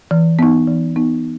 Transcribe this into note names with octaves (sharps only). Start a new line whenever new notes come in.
E3
B3 D#4
E3
B3 D#4